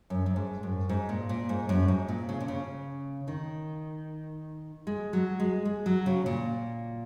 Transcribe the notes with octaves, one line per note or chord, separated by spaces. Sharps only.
F#2
F#2
G#2
F#2
G#2
A#2
A#2
G#2
F#2
G#2
A#2
C#3
A#2
C#3
D#3
G#3
F#3
G#3
G#3
F#3
C#3
A#2